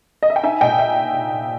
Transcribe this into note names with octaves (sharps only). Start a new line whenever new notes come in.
D#5
E5
G5
D#4 E5 G#5
A#2 D#5 G5
E5